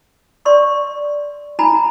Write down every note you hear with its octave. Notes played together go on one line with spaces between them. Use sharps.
D5 C6 C#6
D#4 G#5 A#5 B5